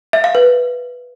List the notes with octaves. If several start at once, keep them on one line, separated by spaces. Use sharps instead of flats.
E5
F5
B4